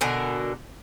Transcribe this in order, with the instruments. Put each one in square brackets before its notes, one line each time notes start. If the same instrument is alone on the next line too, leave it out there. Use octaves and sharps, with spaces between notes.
[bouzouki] B2 D3 A#4 G#5